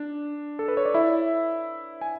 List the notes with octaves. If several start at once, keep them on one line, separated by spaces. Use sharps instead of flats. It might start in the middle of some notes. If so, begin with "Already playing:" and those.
Already playing: D4
A4
B4
C#5
D5
E4 E5
G#5